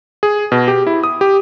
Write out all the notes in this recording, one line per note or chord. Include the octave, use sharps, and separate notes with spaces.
G#4
B2
G4
E4
D#6
G4